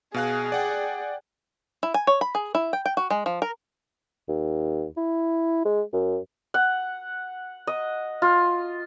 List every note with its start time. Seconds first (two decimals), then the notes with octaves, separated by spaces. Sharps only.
0.14 B2 G#4 F5 F#6
0.52 D5 F#5 G5
1.83 E4
1.94 G#5
2.07 C#5
2.21 B5
2.35 G#4
2.55 E4
2.73 G5
2.86 G5
2.97 F#4
3.10 G#3
3.26 F3
3.42 A#4
4.29 D#2
4.97 E4
5.65 G#3
5.93 F#2
6.54 F#5
7.67 D#5
8.22 F4